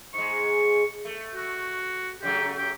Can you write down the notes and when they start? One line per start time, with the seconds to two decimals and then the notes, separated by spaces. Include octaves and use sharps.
0.14 G#2 G#3 C#6
1.05 A3
1.35 F#4
2.23 C#3 F#3 A3 G4
2.57 G4